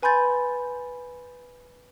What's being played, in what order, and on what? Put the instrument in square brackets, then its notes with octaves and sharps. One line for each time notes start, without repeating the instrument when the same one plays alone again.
[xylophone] B4 G#5 B5 C6 G6 A6